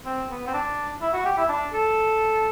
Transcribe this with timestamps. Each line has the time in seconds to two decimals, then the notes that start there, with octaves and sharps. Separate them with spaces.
0.06 C4
0.29 B3
0.47 C4
0.54 D4
1.02 E4
1.14 F#4
1.25 G4
1.38 E4
1.49 D4
1.73 A4